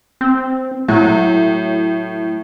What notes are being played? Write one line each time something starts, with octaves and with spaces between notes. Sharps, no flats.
C4
A2 F#3